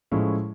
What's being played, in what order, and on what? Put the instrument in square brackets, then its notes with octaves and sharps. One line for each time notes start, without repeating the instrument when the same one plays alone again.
[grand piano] A2 F3 G#3 C#4 E4